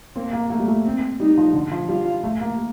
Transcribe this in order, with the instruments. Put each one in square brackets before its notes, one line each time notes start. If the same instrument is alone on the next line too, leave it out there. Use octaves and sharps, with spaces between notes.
[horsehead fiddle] A#3 [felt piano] C4
[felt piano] A#3
[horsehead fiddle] A3 [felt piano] A#3
[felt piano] G3
A3
[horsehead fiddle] C4
[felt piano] G3 [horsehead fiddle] D#4
[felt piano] F3
D3
F3
[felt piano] G3 [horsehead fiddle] F4
[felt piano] A3
A#3